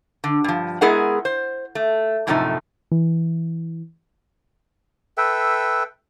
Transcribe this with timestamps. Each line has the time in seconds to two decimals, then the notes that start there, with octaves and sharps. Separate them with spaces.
0.24 D3
0.44 G2 F3
0.81 G#3 B3 E4 G#4 A#4 F#5
1.25 C5
1.75 A3
2.27 F#2 A2 C3 F3 A3 D#4
2.92 E3
5.17 A4 B4 E5 G5